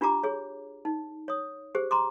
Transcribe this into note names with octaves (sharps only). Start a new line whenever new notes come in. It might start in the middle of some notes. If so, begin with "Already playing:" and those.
D4 F4 G4 A#5 D6
G#4 C#5
D#4
C#5 D#6
G4 G#4 C5
A#5 C6 D6